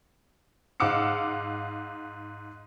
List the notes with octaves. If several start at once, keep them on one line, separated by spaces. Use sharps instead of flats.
G#2 F5 F#5 D6 E6 C#7